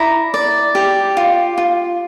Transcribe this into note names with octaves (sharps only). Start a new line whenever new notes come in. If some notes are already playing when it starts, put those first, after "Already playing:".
Already playing: E4 D5 A#5
D5
G4
F4
F4